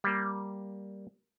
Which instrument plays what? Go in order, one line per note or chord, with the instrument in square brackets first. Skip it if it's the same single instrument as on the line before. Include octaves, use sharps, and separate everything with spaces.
[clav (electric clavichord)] G3 A#3